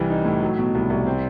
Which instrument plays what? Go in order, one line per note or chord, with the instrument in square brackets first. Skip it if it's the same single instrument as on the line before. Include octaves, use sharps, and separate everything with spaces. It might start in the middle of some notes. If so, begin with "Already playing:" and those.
Already playing: [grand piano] C2 E3 G3
D#4
A2
F#3
B2
C2
C2
C4